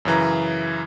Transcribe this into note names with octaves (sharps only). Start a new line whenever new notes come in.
F#2 C#3 E3 A#5